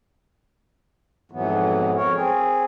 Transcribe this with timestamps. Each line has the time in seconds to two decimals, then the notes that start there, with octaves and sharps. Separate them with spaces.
1.31 F2 G#2 B2 E3 F#3 B3
1.95 F2 A#4 C#5
2.14 C4 G#4